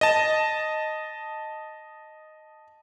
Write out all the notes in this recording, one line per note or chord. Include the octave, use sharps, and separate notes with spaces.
D#5 A5